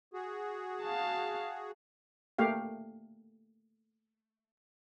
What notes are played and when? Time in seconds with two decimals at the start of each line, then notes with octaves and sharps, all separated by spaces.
0.14 F#4 G#4
0.83 F5 A5
2.38 A3 A#3 G4 F5